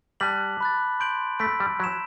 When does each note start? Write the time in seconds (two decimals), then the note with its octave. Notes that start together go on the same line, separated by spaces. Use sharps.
0.20 G3 A5 D6 F#6 B6 F#7
0.60 B5 F#6 A6
1.00 C6 G6 D7 F#7
1.39 A3 B5 E6 B6 D7
1.60 G3
1.80 F#3 G6 B6 E7